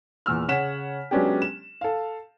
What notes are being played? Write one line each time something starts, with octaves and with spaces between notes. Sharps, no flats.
E2 A#2 E6 F6
C#3 C#5 F#5 B6 E7
F#3 G#3 B3 C#4 D4 G4
E7
A4 F5